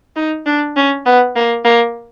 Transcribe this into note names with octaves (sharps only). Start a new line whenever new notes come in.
D#4
D4
C#4
B3
A#3
A#3